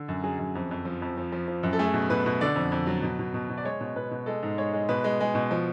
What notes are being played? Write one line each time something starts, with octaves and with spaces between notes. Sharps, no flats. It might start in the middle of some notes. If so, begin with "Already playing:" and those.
Already playing: D3
F#2
F#3 G#4
F#2
F2
F2
F3
F2
F3
F3
F3
F#2
A4
A3 G#4
B2
B2 B4
B2
D3 D5
F2
F2
F#3
B2
B2
B2
B2
D5
G#3 C#5
B2
B2 B4
B2
G#3 A4
G#2
G#3 C#5
G#3
B2 B4
G#3
G#3
B2
F3